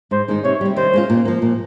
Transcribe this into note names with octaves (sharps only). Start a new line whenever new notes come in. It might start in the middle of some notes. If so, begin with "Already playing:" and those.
G#2 C5
D#3 G#3 D#4
C3 C#5
G3 C4
D#3 C5
G#3 C#4 F4
A#2
F3 A#3
A#2